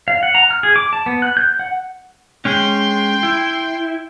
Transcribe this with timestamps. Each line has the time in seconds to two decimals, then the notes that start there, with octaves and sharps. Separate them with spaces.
0.08 F5
0.23 F#5
0.35 A#5
0.51 F6
0.63 G#4
0.76 D6
0.93 A5
1.06 B3
1.22 F#6
1.37 G6
1.59 F#5
2.45 G#3 C#4 G5 C6
3.23 E4